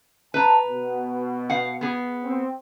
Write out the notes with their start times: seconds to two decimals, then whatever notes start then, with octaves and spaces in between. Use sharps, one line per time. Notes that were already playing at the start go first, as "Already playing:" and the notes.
0.34 B4 A5 A#5
0.67 B2
1.50 F5 F#5
1.81 B3 G#4
2.24 C4